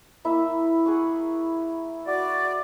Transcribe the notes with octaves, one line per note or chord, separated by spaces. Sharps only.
A#3 E4 E5
G#4 F#5 C#6
F#4 D5